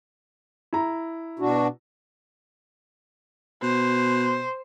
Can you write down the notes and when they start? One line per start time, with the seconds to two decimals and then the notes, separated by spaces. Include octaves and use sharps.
0.73 E4 A#5
1.39 B2 D4 F#4
3.63 B2 C5